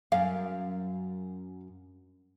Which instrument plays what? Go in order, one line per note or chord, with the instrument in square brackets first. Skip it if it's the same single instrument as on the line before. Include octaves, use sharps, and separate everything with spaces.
[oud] F#2 [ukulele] F5